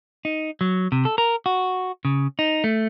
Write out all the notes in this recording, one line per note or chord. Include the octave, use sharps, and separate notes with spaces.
D#4
F#3
C3
A4
A#4
F#4
C#3
D#4
A3